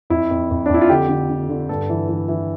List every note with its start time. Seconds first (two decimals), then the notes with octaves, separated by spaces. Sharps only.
0.10 F2 E4
0.31 F2
0.51 F2
0.66 D4
0.69 F2 E4
0.81 F4
0.89 D3 G4
1.09 D3
1.30 D3
1.49 D3
1.69 G2 A4
1.90 E3
2.09 E3
2.28 E3